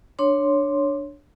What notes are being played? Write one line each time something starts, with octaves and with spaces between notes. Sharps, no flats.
D4 C#5 C6